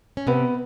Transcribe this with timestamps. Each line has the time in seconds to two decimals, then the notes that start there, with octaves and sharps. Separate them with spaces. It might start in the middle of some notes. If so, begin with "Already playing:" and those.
0.17 C#4
0.27 C3 B3 C4